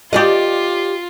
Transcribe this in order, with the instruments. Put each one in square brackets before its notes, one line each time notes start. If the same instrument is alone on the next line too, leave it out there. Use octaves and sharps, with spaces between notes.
[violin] F4 [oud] G4 D5 D#5